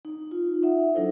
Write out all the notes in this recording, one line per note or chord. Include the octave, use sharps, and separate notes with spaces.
D#4
F4
D#4 E5 F#5
F#3 D4 E4 A4 C5